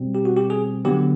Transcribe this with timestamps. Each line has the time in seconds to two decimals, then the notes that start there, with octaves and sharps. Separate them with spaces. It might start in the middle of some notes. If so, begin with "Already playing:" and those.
Already playing: B2 G3 C4
0.15 G4
0.25 F#4
0.36 G4
0.50 G#4
0.85 D3 F#3 B3 G4